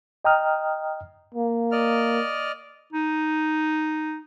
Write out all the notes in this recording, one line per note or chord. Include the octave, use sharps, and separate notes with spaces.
D#5 G5 A#5 D#6 F6
A#3
D5 D#5 F6
D#4